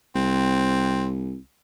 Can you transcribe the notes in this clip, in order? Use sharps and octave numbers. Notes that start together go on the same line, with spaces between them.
C2 C4